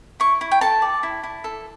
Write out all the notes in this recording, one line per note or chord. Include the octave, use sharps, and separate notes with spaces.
E4 C#6
E4
G5
A4 A5
D5
E4
E4
A4